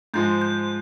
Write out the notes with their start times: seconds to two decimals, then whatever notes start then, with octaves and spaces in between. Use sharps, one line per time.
0.14 G#2 F3 G#3 G6
0.42 G6